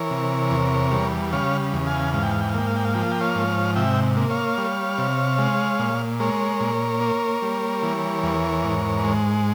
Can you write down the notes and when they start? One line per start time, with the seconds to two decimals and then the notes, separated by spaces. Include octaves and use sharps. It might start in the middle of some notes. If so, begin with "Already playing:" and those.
Already playing: E3 A#4 C#5
0.11 C3
0.51 E2
0.92 G3
1.33 C#3 C#5 F5
1.73 E2
1.87 F5 G#5
2.14 G#2 F5
2.23 G5
2.31 F5
2.41 G5
2.49 F5
2.54 A#3 G5
2.67 F5
2.76 G5
2.85 F5
2.94 F3 G5
3.03 F5
3.12 G5
3.21 C#5 F5
3.35 G#2
3.76 C3 E5 G5
4.17 A#3
4.30 C#5 F5
4.58 G3
4.98 C3
5.38 G#3
5.79 A#2
6.20 G#3 A#4 C#5
6.60 A#2
7.01 A#3
7.42 G3
7.83 E3
8.23 E2
8.64 G#2
9.04 G#3